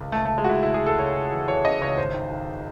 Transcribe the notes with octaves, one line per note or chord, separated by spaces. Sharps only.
C#2
A3
C#2
A3
C#2 G#3
F#4
C#2 E4
C#2 E4
G#4
C#2 A4
C#2 C#5
C#2
E3
E3 C#5
C#3 D#5
C#2 C#5
G#1 C5
D#3
D#3